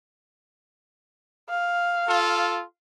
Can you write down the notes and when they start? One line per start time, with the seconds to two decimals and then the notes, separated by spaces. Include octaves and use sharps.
1.49 F5
2.07 F4 A4